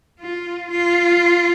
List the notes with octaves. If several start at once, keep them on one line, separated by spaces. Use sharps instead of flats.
F4
F4